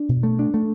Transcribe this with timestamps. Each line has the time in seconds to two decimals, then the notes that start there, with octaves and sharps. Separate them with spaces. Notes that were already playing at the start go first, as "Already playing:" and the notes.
Already playing: D4
0.09 B2
0.23 A3
0.39 D4
0.54 A3